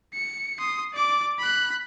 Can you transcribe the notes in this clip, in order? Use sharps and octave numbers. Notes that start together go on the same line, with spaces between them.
C#7
C6 D#6
D5 D6
B5 F#6